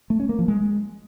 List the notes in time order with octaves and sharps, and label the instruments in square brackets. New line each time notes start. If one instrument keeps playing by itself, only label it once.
[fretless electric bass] A3
C#4
A#3
F3
G#3